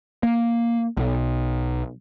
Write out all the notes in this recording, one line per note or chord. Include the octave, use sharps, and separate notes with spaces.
A#3
B1